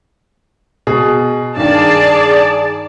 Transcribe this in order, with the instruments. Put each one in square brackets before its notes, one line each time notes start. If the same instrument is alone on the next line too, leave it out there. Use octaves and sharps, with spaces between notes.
[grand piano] B2 G#4
[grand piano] G2 D#3 [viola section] G#4 D5 A5